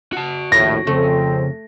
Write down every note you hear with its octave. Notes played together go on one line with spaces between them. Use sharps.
F#4 A5
A#1 D#2 A2 A#6
F2 C#3 A3 C4